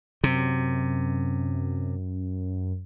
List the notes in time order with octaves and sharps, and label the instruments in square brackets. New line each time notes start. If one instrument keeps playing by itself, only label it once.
[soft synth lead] F#2 [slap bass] C3